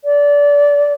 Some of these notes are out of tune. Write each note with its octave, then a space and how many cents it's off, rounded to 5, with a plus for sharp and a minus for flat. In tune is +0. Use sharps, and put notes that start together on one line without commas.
D5 -25